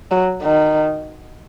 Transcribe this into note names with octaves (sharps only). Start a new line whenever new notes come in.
F#3
D#3